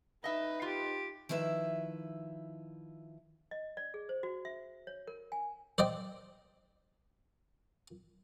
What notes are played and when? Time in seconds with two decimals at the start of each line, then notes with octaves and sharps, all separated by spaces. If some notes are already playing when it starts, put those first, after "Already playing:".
0.24 D#4 B4 D#5 E5
0.62 F4 G4
1.29 D#3 F3 E4 B4 E5
3.51 D#5
3.77 D5
3.94 G#4
4.09 C5
4.23 F#4
4.45 E5
4.87 C#5
5.07 A#4
5.32 G#5
5.78 C5 D5 D#5 G5